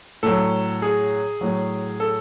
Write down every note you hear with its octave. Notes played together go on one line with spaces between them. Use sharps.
A2 F#3 A4
G#4
A2 F#3
A4